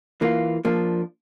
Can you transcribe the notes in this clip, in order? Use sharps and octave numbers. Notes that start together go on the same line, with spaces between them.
E3 A#3 F4
F3 A#3 D4